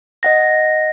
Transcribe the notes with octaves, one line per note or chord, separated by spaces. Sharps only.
D#5 F#5 A#6